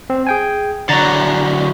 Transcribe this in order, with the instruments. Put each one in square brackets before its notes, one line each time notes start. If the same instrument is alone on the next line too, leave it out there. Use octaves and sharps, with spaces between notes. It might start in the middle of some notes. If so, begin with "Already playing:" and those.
[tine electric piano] C4
G#4 G5 G#5
[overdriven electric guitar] D3 F#3 [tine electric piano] A#5 A6